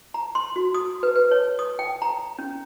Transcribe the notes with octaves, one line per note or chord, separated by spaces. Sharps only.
A#5
C6
F#4
D#6
B4
B4
C#5
D#6
G5
A#5
C#4